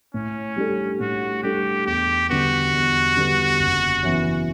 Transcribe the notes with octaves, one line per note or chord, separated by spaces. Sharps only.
A2 C#4
G3 D4 A4
A2 F#4
G3 D4 G4 A4
E2 G4
D3 G3 B3 F#4
E2
D3 G3 B3
F#1
F#2 E3 B3